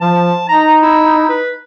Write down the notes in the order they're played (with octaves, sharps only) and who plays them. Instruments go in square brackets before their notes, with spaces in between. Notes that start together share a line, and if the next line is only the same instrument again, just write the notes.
[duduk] F3 [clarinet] A5
[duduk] D#4 [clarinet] A#5
[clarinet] E4
B4